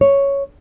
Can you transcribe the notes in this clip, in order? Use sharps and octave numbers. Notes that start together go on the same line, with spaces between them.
C#5